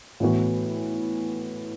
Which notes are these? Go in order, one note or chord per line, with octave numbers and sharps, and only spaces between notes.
A2 E3 B3 F#4